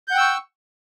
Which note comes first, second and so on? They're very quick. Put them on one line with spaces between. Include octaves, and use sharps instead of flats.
G6 F#5 G5 E6 C#6